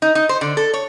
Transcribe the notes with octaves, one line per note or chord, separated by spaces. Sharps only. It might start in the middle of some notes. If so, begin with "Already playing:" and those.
D#4
D#4
C5
D3
A4
C#5